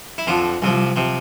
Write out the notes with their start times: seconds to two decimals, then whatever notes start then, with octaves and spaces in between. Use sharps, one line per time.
0.18 E4
0.27 F2 D3 F3 F4
0.62 C2 C3 F3
0.96 C3 F3